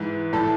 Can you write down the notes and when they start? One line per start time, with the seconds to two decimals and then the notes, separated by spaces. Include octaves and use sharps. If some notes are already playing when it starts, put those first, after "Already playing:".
Already playing: G#2 E3
0.33 A2 E3 A4